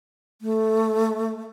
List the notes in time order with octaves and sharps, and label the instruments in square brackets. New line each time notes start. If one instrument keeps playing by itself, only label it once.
[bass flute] A3